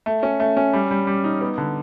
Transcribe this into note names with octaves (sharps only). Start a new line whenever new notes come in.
A3
C#4
A3
C#4
G3
G3
G3
D#4
B3
D3